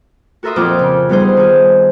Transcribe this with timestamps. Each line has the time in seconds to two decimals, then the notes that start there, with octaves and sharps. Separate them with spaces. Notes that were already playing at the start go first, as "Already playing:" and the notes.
0.43 F#4 A4 A#4 E5 C6 D#6
0.56 F2 A#2 C4 G5 D6 F6
0.79 C#3
1.09 G3 B3 D#4 G#4 C5
1.37 D#3 G#4